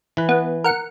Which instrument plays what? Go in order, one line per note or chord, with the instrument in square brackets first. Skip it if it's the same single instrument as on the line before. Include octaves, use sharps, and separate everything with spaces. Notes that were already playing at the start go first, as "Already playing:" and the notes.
[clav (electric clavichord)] E3 B4
[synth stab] B3
A#4 F#5 C#7